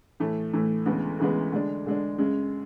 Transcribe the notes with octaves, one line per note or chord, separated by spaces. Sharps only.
A2 E3 A3
A2 E3 A3
D2 C#3 E3 G#3 B3
D2 C#3 E3 G#3 B3
D3 G#3 D4
D3 G#3 D4
F#2 C#3 G#3